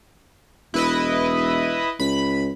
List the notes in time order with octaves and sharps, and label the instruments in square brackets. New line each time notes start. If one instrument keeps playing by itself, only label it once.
[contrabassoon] E1 [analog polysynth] E4 B4 D#5
[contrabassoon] C#2 [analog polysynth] B5